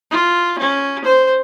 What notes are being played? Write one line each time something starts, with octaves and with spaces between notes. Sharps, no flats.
F4
C#4
C5